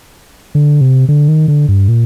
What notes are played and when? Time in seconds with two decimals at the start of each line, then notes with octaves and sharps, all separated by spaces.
0.55 D3
0.81 C3
1.09 D3
1.28 D#3
1.48 D3
1.68 G2
1.88 A#2